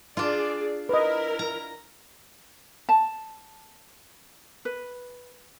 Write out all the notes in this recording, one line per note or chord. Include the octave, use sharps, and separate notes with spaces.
D4 F4 G#4 D5
E4 A#4 B4 D#5
A#5
A5
B4